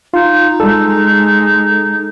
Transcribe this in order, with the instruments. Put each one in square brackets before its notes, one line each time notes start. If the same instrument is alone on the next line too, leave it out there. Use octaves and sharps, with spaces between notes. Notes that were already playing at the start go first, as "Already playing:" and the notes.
[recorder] D#4 [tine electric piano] F4
[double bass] G#3 [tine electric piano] A4